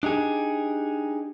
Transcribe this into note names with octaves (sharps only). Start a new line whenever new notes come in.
D4 D#4 G4 G#4